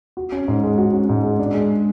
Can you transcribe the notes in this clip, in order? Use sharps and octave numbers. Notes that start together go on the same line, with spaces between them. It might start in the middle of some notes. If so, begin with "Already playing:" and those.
F#4
C#4
G#2
G#3
F#4
C#4
G#2
G#3
D4
G#3